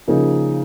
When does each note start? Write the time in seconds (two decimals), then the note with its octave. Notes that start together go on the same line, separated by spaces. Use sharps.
0.08 C#3 F3 A#3 D#4 G#4